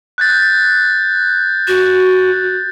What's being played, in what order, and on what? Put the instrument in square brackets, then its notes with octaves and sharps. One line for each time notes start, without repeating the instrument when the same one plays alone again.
[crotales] F#6 G6 A6
[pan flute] F#4